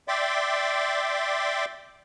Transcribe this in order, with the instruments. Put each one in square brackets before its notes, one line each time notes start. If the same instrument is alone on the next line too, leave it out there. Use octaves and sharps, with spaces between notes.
[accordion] D5 E5 G5 C6 D6